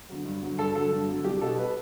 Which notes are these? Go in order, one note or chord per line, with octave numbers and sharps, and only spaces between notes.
D3 F#3
G2
D3 F#3
G2 A4
D3 F#3 A4
G2
D3 F#3
C2 G4
B2 G3 A4
B4